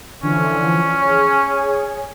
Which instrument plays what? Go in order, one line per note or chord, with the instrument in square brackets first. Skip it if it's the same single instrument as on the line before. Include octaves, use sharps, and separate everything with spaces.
[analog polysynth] D3 E3 F3 [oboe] C#4
[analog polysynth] G#4 C#5 G#5